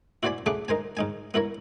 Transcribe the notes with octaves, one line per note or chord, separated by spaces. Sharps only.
E4 F#4 C5 D5 G#5 B5
C#3 A3 G#4 F#5 B5 D6
D#4 A#4 C5 G#5
G#2 D#4 G#5
B3 E4 A#4 C#5